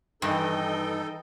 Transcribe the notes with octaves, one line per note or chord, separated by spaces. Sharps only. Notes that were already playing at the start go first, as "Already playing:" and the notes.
G2 D#3 E3 D#4 A4 D#5 G5